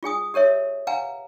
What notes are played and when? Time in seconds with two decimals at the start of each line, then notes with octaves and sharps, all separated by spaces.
0.03 F4 G#4 G#5 D#6
0.34 G4 A#4 C#5 E5
0.87 B4 F5 F#5 G#5 A#5